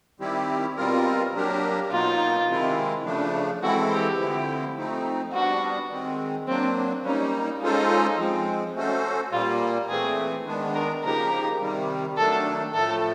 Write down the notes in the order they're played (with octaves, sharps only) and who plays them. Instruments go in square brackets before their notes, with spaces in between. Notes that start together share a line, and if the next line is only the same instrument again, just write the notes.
[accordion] D#3 G3 C4 E4 G4
B2 G3 C4 F4 A#4
F#3 A#3 D4 G4 A#4
[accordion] B2 F#3 A#3 D#4 [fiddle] F4
[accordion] C3 D#3 G#3 C4 E4
C#3 F3 A3 D4
[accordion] E3 G#3 C4 E4 A4 [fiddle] F#4
[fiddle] G4
[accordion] D3 F3 A3 C4 E4
F3 A3 C4 D#4
[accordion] G3 B3 D4 [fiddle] F#4
[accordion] D#3 G#3 C4
[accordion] F#3 A#3 D4 [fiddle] C4
[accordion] G3 A#3 D#4 [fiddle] C#4
[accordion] G#3 C#4 F4 A4 C5 [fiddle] D#4
[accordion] F3 G#3 C4
A3 C#4 F#4 A4 C5
[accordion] A#2 G3 A#3 [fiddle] F4
[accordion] E3 A3 C4 [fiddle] G#4
[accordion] D#3 G#3 B3 D4
[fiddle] A#4
[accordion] C#3 F3 A#3 D#4 G4 [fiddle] A#4
[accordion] C3 D#3 G3
[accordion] D#3 F#3 A3 D4 [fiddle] A4
[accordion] A2 F3 A3 [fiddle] A4